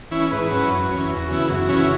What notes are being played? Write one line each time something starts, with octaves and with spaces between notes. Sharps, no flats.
E3 C#4 E4
G#2 B4
F#3 C#4 E4
F#2
E3 C#4
E2 F#4
C#3 E3 B3 E4
F#2 F#4
C#3 E3 C#4 E4